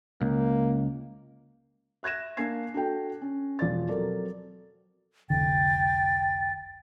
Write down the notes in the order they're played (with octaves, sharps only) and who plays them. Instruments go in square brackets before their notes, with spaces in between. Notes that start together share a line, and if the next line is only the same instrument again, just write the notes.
[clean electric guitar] C#2 [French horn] A#3
[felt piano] E5 F#6 G#6 A#6 E7
A#3 D4 G#5 G#6 C7
D4 F#4 A4 G5
C#4
E1 F3 D5 A6
F#3 C4 A4 A#4 D5
[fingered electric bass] F1 C2 D3 [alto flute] G5 [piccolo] A6